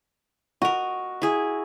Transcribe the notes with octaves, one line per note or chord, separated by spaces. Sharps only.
F#4 A#4 D#5
E4 G#4